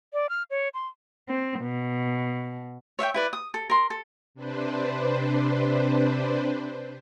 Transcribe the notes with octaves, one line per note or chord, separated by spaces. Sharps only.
D5
F6
C#5
C6
C4
B2
C#5 E5 F5 G5
E4 B4 D5
D#6
A4
A#4 C6
A4
C3 D4 B4 C5